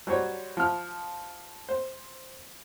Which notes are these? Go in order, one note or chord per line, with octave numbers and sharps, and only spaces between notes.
F#3 G3 C5 C#5
F3 F6
C5